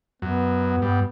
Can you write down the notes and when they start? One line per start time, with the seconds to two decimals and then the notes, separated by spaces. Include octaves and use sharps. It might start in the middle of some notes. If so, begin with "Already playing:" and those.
0.22 F#2 B3
0.82 G2